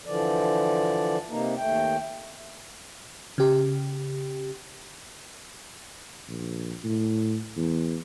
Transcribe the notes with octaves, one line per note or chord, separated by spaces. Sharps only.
D3 E3 F3 D5
C3 A#3 D#4
D#2 A3 G5
C#3 G4
A#1
A2
E2